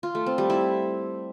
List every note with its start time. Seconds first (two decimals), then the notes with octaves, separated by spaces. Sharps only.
0.03 F4
0.15 A3
0.26 C4
0.38 G3
0.50 E4